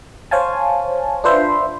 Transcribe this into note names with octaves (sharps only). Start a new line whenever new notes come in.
C5 C#5 F5 G#5 A5
D4 F4 B4 C5 E5